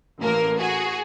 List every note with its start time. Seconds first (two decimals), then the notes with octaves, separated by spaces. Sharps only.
0.18 A1 A#3 A#4
0.57 F#4 G#4